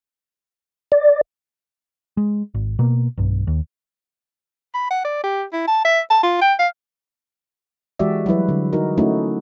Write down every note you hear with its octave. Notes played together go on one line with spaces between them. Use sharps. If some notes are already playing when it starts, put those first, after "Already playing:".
D5
G#3
G#1
B2 A#3
B1 G2
D#2
B5
F#5
D5
G4
E4
A5
E5
A5
F4
G5
F5
E3 G#3 F#4 G4 D5 E5
F#3 G3 E4 B4
D3
D#4 F#4 A#4
A3 C#4 D#4 E4 F#4